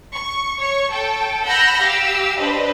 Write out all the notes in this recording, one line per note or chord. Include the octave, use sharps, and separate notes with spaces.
C#6
C#5 C#6
A4 G5
F#5 B5 E6 F6 G6 A#6
G4 F5 E6
D4 B4 C5 D#5